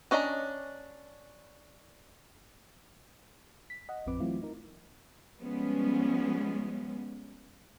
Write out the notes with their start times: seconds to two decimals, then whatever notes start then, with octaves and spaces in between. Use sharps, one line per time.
0.11 C#4 D4 D#5 F5 A#5
3.70 B6
3.89 D#5 F#5
4.06 A1 F2 F3 C4 B4 D6
4.20 E3 F#3 A3 C4 E4 F4
4.42 D#4 A#4
5.39 F3 G3 G#3 B3 C#4